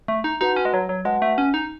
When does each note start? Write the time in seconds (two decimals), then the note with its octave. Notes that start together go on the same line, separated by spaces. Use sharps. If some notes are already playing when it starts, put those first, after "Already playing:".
0.08 A3
0.24 D#4
0.41 D#4 F#4 B4 F#5 A5
0.56 C#4
0.65 G#3
0.74 F#3
0.89 F#3
1.05 G#3 F#4 B4 F#5 A5
1.22 A3
1.38 C#4
1.54 D#4